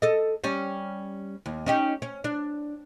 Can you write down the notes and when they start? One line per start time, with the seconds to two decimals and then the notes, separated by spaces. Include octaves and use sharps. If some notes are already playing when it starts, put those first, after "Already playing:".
0.02 A4 D#5
0.44 G3 C#4
1.46 D#2
1.66 C#4 D#4 G4
2.02 C#4
2.24 D4